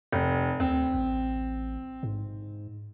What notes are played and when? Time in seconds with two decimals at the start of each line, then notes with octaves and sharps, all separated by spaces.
0.13 F1
0.60 D2 C4
0.94 A1
2.03 G#2